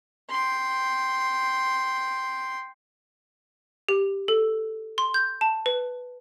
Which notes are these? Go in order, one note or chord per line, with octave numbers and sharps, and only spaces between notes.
G5 C6
G4
A4
C6
G6
A5
B4